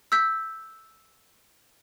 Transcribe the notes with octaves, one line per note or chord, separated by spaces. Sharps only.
E6 G6 B6